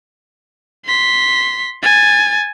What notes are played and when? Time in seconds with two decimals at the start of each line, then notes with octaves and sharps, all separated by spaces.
0.86 C6 B6
1.83 G#5 A6